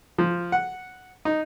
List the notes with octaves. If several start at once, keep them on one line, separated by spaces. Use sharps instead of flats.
F3
F#5
D#4